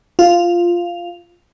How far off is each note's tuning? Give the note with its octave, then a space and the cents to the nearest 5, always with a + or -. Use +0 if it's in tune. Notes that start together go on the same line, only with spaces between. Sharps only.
F4 -5